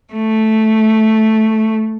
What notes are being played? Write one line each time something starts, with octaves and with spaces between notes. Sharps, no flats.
A3